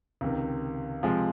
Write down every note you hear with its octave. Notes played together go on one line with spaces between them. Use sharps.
C#2 C3 D#3
C3 F3 G#3